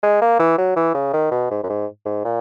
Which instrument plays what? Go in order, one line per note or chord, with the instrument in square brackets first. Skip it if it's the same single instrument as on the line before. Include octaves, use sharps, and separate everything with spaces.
[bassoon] G#3
A#3
E3
F#3
E3
C#3
D#3
B2
G#2
F#2
G#2
G#2
A#2